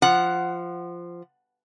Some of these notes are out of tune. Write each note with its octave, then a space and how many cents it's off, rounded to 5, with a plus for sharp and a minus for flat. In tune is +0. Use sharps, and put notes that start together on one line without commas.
F3 -10 F#5 +10